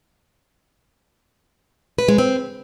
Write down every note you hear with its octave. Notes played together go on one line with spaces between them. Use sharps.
B4
G#3
C4